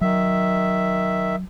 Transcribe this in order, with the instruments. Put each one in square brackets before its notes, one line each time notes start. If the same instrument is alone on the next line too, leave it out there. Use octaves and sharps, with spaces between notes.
[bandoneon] D#3 E5 [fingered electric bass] F#3